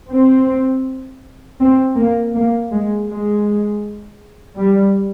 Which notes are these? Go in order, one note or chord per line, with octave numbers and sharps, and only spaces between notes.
C4
C4
A#3
A#3
G#3
G#3
G3